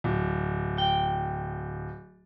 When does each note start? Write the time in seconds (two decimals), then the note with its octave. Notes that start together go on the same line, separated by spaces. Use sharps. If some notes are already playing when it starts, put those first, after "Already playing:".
0.04 D1
0.78 G5